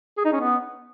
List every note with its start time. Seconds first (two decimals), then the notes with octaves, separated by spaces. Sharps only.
0.17 G#4
0.25 D#4
0.32 C#4
0.40 B3